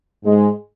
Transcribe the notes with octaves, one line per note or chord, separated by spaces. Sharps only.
G#2 G#3